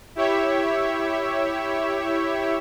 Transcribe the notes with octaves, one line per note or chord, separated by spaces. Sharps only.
E4 G4 C#5 E5